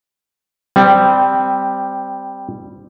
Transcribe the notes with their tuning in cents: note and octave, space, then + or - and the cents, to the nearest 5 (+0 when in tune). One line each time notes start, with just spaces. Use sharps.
G3 +0 C4 -15